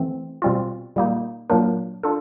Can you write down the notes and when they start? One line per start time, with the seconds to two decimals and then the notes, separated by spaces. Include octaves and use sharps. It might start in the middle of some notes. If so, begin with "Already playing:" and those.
Already playing: E3 A3 C4
0.42 B2 G3 C4 F4
0.96 A#2 G3 A#3 D#4
1.50 A#2 F#3 A#3 D4 A#4
2.03 D4 F4 A4